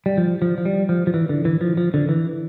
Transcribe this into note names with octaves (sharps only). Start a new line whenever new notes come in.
G3
F3
F3
F3
G3
F3
F3
E3
D3
E3
F3
F3
D3
E3